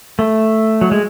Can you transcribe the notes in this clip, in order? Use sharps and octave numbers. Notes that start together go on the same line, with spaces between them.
A3
F#3
G#3